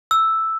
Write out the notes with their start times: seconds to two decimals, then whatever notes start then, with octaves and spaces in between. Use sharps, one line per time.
0.11 E6